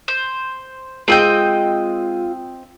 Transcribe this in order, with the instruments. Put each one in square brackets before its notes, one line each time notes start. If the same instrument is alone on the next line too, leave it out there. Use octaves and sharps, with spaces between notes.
[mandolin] C5
[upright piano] G#3 E6 D#7 [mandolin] C4 D#5 G5 [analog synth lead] F4